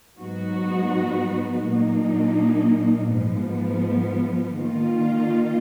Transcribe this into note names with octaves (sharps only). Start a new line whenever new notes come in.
G#2 F#3 B3 D#4 F#4
A#2 F#3 A#3 D#4
G#2 F3 B3
D#3 A#3 F4